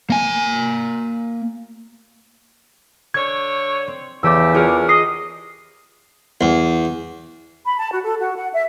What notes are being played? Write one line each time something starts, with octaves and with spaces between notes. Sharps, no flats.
A#3 G#5
D3 C#5 C#6 G#6
C4
E2 C#3 E3 A3 G4 D6 E6
C#4 D4 F4 G4 G#4 A#4
D#5 D#6 C7
E2
B5
A5
F#4
A4
F#4
F#5
E5